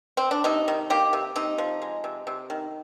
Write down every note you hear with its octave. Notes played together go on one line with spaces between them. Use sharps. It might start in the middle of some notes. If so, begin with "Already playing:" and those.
C4
D4
C3 D#4
D#3
A#3 G4
C3
C3 D#4
F3
G#3
C3
C3
D#3